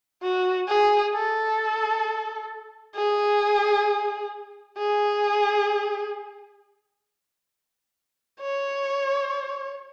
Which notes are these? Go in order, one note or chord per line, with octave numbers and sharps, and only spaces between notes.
F#4
G#4
A4
G#4
G#4
C#5